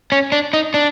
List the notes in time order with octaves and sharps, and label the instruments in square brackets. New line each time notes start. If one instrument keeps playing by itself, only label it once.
[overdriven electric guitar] C#4
D4
D#4
D4